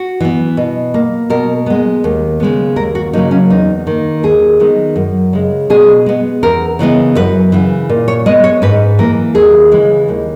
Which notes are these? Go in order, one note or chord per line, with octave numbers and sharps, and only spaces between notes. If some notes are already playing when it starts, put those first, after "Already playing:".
Already playing: F#4
E3 B3
B2
A#3
B2 A#4
G#3 B3
D#2
C#3 G#3 B3
D#2 A#4
F#4
C#3 F#3 A#3 D#4
C#4
E2 D#4
D#3 A#3
D#2 G#4
D#3 G#3 B3
F#2
C#3 G#3
B2 G#4
G#3 B3
E2 A#4
C#3 E3 G#3 B3
F#2 B4
C#3 E3
A#2
C#5
G#3 B3 D#5
C#5
G#2 B4
E3 A#3 A#4
D#2 G#4
C#3 E3 G#3
D#2